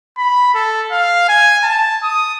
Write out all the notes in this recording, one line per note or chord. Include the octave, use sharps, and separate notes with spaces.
B5
A4
F5
G#5
A5
D#6